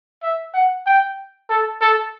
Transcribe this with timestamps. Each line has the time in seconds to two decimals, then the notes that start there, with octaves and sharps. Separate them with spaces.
0.23 E5
0.54 F#5
0.87 G5
1.50 A4
1.81 A4